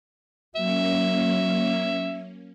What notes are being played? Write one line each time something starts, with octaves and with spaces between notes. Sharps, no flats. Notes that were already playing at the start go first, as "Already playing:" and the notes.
F#3 A#3 C#4 E5